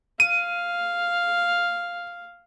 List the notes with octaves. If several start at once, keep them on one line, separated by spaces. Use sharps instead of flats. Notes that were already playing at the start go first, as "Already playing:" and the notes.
F5 D#7